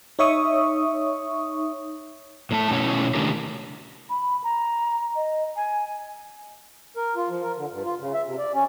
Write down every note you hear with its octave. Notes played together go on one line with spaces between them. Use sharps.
D#4 C#5 E5 C#6 D#6
A2 A3 A5
B2 A3 C#4 E4 C#5
C3 D#3 A3 D4 G4 A#4
B5
A#5
D#5
G#5
A#4
F4
F3
A#4
D3
G2
F4
C#3
E5
C3
D5
C#4